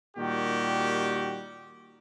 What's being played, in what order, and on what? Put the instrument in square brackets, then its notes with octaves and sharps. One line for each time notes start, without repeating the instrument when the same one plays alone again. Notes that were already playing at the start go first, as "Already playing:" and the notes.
[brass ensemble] A#2 D#3 G3 F#4 G4